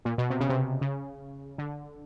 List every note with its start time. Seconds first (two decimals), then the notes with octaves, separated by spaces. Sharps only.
0.05 A#2
0.18 B2
0.30 C3
0.40 C#3
0.49 C3
0.81 C#3
1.58 D3